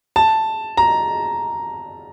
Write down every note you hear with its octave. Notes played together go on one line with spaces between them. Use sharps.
A5
A#5